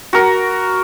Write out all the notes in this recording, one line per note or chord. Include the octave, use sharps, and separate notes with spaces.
F#4 A#4